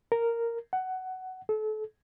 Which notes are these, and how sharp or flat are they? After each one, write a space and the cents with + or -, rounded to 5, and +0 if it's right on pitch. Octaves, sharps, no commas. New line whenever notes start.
A#4 -5
F#5 +15
A4 -35